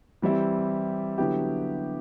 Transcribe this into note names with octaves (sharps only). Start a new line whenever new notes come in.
E3 G3 C4 E4 G4
D3 F#3 B3 E4 G4